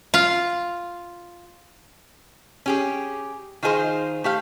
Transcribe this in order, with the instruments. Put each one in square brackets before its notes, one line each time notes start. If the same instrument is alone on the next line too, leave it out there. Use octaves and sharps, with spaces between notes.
[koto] F4 F5
[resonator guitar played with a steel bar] C#4 G4 G#4
D#3 D#4 F4 G#4 A#4 C5
A3 G4 F5